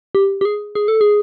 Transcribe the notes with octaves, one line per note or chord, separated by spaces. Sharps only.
G4
G4
G#4
G#4
A4
G#4